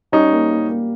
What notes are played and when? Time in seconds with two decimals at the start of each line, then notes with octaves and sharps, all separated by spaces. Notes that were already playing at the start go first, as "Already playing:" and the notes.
0.12 G3 C#4 D#4
0.32 A#3
0.50 A#3
0.69 A#3